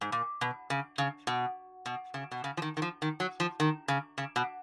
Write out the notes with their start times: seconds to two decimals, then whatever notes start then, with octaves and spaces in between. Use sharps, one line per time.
0.01 G#2
0.12 A#2
0.41 B2
0.70 C#3
0.98 C#3
1.27 B2
1.86 B2
2.14 C#3
2.31 B2
2.44 C#3
2.57 F3
2.62 D#3
2.77 D#3
2.82 F3
3.02 D#3
3.20 F#3
3.40 F3
3.60 D#3
3.88 C#3
4.18 C#3
4.36 B2